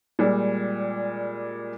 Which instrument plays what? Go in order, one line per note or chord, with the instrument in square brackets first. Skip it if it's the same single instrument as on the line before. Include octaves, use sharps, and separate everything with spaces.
[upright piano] A#2 G3 G#3